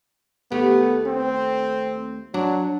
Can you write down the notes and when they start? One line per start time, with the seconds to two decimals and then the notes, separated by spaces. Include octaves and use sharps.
0.52 D#2 A3 B3 G4
1.06 C4
2.34 F#3 D4